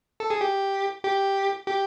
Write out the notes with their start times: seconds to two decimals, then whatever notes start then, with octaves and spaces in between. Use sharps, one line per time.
0.20 A4
0.30 G#4
0.41 G4
1.04 G4
1.68 G4